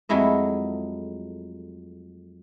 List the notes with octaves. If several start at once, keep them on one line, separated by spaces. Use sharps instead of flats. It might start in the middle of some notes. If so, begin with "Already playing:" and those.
F2 F#3 G#3 A3 E4 D#5